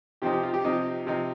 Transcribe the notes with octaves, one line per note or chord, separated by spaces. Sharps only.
C3 F3 C4 D#4 G4
G4
F4
G4
C3 F3 C4 D#4
C3 F3 C4 D#4